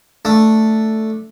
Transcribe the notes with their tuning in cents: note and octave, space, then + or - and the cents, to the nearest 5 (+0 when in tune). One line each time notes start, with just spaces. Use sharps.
A3 +0 D4 +0